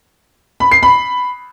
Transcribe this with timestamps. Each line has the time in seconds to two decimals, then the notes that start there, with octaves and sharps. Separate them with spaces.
0.60 B5
0.71 C7
0.83 B5